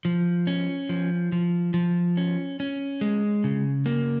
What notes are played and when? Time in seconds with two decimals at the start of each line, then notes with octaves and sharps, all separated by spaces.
0.05 F3
0.47 C#4
0.89 F3
1.32 F3
1.74 F3
2.17 C#4
2.60 C#4
3.01 G#3
3.44 C#3
3.86 A#3